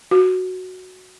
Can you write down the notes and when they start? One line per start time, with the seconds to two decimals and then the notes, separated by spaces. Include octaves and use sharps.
0.11 F#4